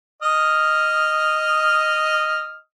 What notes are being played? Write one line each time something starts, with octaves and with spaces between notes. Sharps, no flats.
D#5 D#6 F6